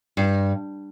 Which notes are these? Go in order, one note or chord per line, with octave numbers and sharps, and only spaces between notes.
G2